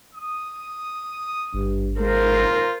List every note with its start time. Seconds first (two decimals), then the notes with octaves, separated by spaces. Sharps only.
0.14 D#6
1.54 G#1 G2
2.00 G#3 F4 A#4 C5